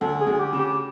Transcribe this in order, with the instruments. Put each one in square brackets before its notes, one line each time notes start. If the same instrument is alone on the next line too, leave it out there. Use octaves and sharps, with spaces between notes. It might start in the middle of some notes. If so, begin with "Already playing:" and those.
[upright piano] D2 [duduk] A4
[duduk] G#4
[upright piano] D2
[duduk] G4
[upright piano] C#3
[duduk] G4